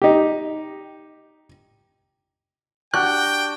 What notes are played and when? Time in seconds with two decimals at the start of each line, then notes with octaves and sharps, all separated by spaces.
0.02 D#4 G4
2.94 D4 F#4 G4 G5 F#6